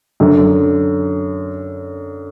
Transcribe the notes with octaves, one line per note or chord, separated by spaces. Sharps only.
F#2 D3